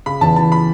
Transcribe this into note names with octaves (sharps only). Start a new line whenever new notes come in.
C#3 B5
E2 A5
E3 A5
B5